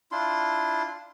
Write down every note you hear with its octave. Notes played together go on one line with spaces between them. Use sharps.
D4 E4 F4 C6